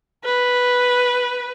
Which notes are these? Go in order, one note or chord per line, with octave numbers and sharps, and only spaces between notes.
B4